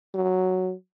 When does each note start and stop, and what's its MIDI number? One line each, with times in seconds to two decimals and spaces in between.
0.14 0.73 54